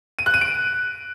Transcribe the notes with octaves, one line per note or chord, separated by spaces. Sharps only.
D#7
F#6
D#7
D7